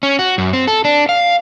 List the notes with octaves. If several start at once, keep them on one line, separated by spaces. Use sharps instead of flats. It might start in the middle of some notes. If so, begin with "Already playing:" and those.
C#4
F#4
F#2
C4
A4
D4
F5